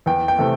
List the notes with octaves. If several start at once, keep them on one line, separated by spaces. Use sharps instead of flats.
E2 G5
G5
C3 E3 A3